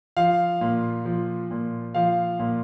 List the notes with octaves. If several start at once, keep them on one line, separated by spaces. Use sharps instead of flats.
F3 F5
A#2
F3
A#2
F3 F5
A#2